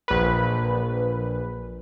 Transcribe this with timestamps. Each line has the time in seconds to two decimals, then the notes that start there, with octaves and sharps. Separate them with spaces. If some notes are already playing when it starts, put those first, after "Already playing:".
0.08 A#1 B4